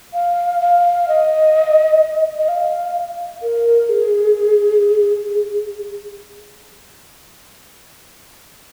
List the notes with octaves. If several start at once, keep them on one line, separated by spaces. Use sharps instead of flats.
F5
F5
D#5
D#5
F5
A#4
G#4